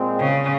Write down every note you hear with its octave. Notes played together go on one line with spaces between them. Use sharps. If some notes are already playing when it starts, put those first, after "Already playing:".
Already playing: A#2 G#3 C4
C#3